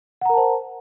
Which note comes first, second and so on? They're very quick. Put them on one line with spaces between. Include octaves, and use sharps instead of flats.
F#5 A#5 A#4 A5 C5